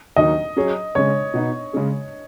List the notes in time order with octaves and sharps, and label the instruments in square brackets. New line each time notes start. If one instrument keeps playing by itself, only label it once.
[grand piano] D#2 D#3 F#3 D#4 [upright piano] D#5
[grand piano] F#3 C#4 G#4 C#5
[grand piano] C#3 G#3 C#4 [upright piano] C#5
[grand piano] B2 B3 D#4
C#3 G#3 C#4 G#4